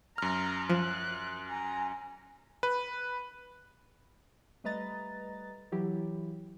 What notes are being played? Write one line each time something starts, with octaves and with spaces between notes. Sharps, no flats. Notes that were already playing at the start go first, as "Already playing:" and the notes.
F#2 A#5 F6
F3 F#6
G#5 A#5
B4
G3 A3 B4 D#5 A#5 A6
E3 F#3 E4 G4